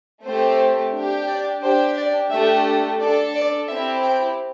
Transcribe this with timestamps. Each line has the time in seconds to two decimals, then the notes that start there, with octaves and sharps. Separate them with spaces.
0.23 A3 C4 G4 C5
0.93 D4 G4
1.27 D5
1.62 D4 G4 C5
1.96 D5
2.30 A3 D4 G4 E5
3.00 D4 A4 D5
3.34 D5
3.68 C4 E4 G4 E5
4.03 G5